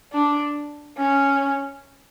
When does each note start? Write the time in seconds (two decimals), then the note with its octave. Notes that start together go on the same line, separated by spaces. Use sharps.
0.13 D4
0.97 C#4